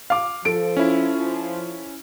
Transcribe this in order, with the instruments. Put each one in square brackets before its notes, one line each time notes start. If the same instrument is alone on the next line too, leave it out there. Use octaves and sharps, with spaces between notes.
[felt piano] F5 D6
[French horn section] F3 [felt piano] A4 D7
[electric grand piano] C#4 E4